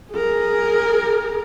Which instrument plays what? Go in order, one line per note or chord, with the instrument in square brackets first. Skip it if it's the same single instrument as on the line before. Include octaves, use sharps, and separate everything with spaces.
[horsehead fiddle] G#4 A#4